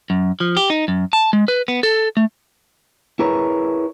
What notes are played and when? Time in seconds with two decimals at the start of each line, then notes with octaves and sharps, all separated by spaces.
0.10 F#2
0.40 F3
0.57 G4
0.70 D#4
0.88 F#2
1.13 A5
1.33 G#3
1.48 B4
1.68 B3
1.83 A4
2.17 A3
3.19 E4 G#4 A#4 B4 C#5